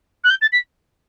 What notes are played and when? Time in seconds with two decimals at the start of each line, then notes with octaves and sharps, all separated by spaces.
0.24 F#6
0.30 G6
0.41 A6
0.52 B6